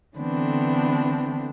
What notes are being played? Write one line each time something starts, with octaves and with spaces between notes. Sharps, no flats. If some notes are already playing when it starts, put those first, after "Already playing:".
D3 E3 A3 B3 C4 D4